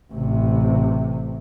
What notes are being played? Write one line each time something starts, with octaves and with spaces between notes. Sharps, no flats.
A1 C3